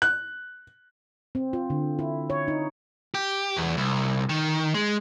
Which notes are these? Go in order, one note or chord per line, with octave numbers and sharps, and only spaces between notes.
F#6
C4
F4
D3
E4
C#5
D#4
G4
E2
C2
D#3
G#3